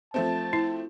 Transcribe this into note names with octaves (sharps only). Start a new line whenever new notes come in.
F3 A3 C4 A5
E4